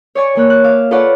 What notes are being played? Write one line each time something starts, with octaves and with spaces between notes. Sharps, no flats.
C#5 D5 G#5 C#6
E3 A#3 C#5 F#6
F#6
E5 F5 D6 E6 F6
F4 A4 B4 C#5 D5 F#5